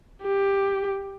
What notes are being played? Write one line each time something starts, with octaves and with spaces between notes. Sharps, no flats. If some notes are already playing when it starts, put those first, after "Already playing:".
G4